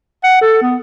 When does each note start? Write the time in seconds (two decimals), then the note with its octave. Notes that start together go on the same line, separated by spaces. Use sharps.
0.24 F#5
0.41 A4
0.62 B3